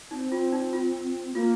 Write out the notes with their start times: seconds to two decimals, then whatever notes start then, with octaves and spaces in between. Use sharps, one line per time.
0.11 C4 D#4
0.32 F4
0.52 D#4
0.73 F4
1.35 A#3 F4